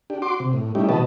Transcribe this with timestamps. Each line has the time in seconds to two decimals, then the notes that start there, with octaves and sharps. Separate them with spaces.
0.10 D4 G4
0.22 F#4 C6 D6
0.40 C3
0.53 A2
0.75 G3 A3 C#4 D#4 E4 G4
0.89 B2 E3 F#4 B4 D#5 A5